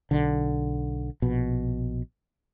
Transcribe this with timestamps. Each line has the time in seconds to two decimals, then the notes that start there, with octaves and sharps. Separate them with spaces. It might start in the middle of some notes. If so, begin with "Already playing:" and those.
0.11 B1 D3
1.22 A#1 B2